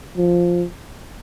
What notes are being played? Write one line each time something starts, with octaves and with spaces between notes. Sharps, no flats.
F3